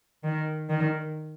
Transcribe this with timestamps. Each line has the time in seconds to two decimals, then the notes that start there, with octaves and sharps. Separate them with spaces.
0.23 D#3
0.69 D#3